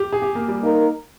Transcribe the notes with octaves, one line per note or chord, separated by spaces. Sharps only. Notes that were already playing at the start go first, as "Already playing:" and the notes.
Already playing: G4
G#4
G4
A#3
G3
A#3 D#4 A#4